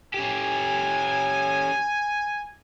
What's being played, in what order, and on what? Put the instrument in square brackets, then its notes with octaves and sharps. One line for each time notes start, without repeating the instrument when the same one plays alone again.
[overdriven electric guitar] C#4 G4 [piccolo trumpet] G#5